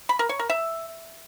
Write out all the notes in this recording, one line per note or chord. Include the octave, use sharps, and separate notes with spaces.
B5
A#4
C#5
A#4
E5